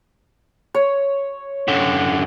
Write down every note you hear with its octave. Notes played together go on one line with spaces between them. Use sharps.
C#5
F#2 D3